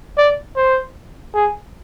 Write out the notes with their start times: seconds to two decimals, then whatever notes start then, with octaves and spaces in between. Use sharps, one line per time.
0.17 D5
0.56 C5
1.34 G#4